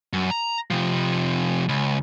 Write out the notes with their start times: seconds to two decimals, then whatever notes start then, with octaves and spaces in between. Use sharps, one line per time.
0.13 F#2
0.31 A#5
0.71 C3 F3
1.69 C#2